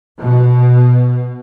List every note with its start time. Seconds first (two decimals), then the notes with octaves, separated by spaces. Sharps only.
0.18 B2